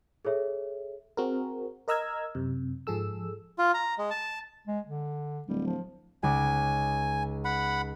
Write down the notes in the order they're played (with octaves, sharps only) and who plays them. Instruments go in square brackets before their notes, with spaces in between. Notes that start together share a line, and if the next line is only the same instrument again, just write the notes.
[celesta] G#4 A4 C#5 E5
[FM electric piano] C4 F#4 G#4 A#4
A#4 D#5 A#5 E6 F6 G#6
F#2 C3
G#2 F3 G#4 A4 E6
[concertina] F4
A#5
G#3
A5
[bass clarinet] G#3
D3
[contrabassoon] D1 [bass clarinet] G3
[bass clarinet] F3
[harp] C#2 D#4 D6 [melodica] G#5
[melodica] F#5 B5